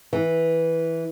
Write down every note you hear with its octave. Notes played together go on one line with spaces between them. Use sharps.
E3